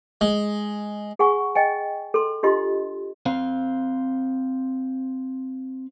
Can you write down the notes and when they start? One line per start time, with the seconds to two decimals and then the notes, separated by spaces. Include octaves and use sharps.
0.21 G#3
1.19 G#4 F#5 G#5 C#6
1.55 D#5 G5 G#5
2.14 A4 C6
2.43 D4 F4 G4 D#5 C6
3.26 C4 C5 F5